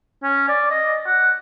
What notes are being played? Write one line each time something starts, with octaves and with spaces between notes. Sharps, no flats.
C#4
D5
D#5
F#5